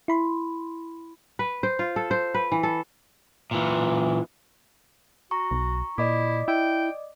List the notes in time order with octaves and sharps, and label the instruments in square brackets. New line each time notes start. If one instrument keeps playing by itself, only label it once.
[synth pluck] E4 B5 C6
[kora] B4
C5
F4
A4
C5
B4
E3
A4
[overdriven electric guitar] A#2 E3
[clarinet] F#4 [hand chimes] A#5 C#6
[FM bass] B1
[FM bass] A#2 [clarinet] E4 [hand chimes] D5 D#5 D6
[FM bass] E4 [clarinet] G5